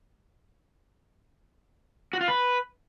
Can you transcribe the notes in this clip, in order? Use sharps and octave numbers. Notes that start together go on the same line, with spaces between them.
F#4
F4
B4